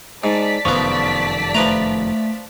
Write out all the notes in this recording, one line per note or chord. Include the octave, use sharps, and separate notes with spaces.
G#2 D5 A5 B6
F1 F#2 D#3 F3 B3 C#6
F3 A3 B4 A#5